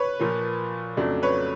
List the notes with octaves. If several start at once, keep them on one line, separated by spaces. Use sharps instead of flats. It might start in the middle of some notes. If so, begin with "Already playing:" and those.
Already playing: B4 C#5
A#2 F3 A#3
F2 C#3 F#3 A3 D4
B4 C#5